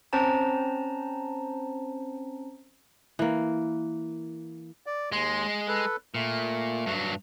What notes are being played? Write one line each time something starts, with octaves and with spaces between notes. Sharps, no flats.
C4 C#4 C5 A5 A#5
E3 A#3
D5
D#2 G#3 C6
A4 B4
A#2 A3
G2 F#3